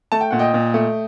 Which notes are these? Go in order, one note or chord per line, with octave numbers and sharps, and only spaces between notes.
A3 A5
G5
A#2 F#5
D#5 G5
A#2
A3